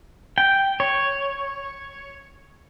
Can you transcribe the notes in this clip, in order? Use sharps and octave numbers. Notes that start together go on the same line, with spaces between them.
G5
C#5